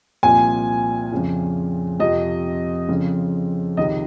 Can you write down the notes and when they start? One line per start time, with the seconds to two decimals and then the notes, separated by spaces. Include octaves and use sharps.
0.23 C2 A#2 F3 G#5
1.12 F2 C#3 F3
2.00 F2 C3 F3 D#5
2.89 F2 C#3 F3
3.77 C#2 C3 D#3 D#5